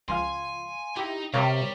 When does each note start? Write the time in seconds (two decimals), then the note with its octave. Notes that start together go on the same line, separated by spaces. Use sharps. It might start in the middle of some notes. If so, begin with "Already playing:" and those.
0.09 C#2 F3 F5 G#5 C6
0.96 D#4 E4 G4
1.34 C3 G3 A#4 C#5 F5